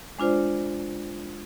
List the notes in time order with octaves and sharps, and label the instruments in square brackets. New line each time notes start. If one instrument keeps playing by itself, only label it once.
[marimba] G#3 D4 F4 C5 D5